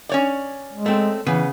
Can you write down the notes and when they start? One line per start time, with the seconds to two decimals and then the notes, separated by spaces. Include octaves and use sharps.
0.09 C#4 C#5 D5
0.73 G#3
0.86 A3 C4
1.26 C#3 E3 B3 B4